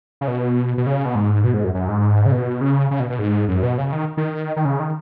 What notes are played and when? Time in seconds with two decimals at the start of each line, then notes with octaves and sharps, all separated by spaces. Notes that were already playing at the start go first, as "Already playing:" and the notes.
0.21 C#3
0.28 B2
0.78 B2
0.86 C#3
1.05 B2
1.15 G#2
1.44 B2
1.54 G#2
1.64 F#2
1.74 F#2
1.89 G#2
2.26 C#3
2.32 B2
2.61 C#3
2.91 C#3
3.00 B2
3.10 B2
3.19 G#2
3.48 F#2
3.63 B2
3.78 C#3
3.92 D#3
4.17 D#3
4.56 D#3
4.65 C#3
4.80 D#3